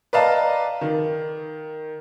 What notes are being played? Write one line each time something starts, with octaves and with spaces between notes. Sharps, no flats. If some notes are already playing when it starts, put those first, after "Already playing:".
B4 D5 D#5 F5 A5 A#5
D#3